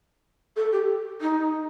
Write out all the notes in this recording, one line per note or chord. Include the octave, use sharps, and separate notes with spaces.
A4
G4
D#4